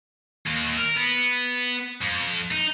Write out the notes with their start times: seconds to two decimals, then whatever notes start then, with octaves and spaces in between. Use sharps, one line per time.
0.46 D#2
0.77 A#4
0.97 B3
2.02 F2
2.52 D#4